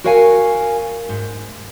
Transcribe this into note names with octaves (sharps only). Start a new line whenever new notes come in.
F#4 A#4 C#5 F5 G5 G#5
G#2